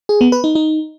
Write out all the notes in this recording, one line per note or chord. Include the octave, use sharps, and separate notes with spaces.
G#4
B3
B4
D#4
D#4